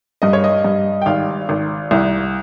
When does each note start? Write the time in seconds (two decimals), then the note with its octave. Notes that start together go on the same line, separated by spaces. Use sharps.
0.22 G2 D#5
0.33 C#5
0.44 D#5
0.64 G2
1.02 G5
1.06 G#1 F5
1.49 G#1
1.91 C2